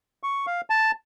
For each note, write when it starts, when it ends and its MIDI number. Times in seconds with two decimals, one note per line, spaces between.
0.23 0.46 85
0.47 0.61 77
0.70 0.91 81